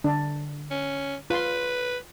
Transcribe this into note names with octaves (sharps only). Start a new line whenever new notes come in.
D3 D4
C#4
F4 B4 C6